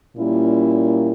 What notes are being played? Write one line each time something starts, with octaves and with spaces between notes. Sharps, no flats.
A#2 G3 A#3 C#4 E4